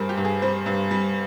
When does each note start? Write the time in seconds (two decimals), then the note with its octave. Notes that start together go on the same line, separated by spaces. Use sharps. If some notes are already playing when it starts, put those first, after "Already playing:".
Already playing: G2 G3 G#4 A#4 C5
0.09 G4
0.17 G2
0.25 G#4
0.42 G3 C5
0.66 G2
0.91 G3